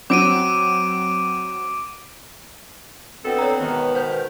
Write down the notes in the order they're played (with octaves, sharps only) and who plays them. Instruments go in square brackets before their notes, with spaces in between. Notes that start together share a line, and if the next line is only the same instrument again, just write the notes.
[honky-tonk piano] F#3 C4 [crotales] D6 D7 D#7
[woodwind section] D2 B3 C4 [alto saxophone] A4
[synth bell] C#5 A#5
[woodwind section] G#2 B2 D#3 [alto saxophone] B3
[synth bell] C5 G6